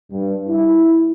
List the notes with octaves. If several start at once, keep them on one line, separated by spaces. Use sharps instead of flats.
G2
E4